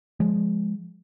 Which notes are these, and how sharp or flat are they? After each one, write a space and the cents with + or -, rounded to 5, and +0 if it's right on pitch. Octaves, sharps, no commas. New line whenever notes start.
F3 +0 G#3 +0